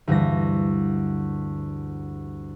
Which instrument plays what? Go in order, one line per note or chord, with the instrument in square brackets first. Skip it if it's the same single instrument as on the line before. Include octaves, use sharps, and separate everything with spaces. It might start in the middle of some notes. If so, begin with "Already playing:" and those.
[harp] D2 G2 E3 A#6